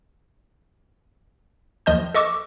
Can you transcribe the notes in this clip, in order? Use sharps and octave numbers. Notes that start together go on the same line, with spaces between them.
D#2 F3 D#5 A5 G6
A4 D#5 C#6 D6 E6